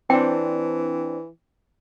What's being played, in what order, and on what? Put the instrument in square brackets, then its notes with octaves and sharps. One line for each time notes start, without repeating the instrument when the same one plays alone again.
[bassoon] E3 [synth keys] C4 D4 [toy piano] G5